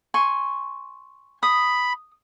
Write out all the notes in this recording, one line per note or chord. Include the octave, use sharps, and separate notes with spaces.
G#5 C6 C#6
B5 D#6